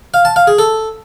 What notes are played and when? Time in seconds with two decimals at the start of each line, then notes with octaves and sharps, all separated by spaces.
0.14 F5
0.25 A5
0.36 F5
0.47 G#4
0.59 A4